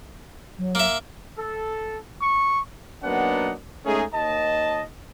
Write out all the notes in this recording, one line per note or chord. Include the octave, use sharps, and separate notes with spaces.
F#3
A#3 E5
A4
C#6
F#3 A#3 B3 D4 D#4 F#5
G#3 A3 C#4 D#4 G#4
D#2 D#5 A5